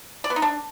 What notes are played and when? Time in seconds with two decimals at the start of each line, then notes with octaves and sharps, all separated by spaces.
0.24 D5
0.30 B3
0.36 D#4
0.42 D4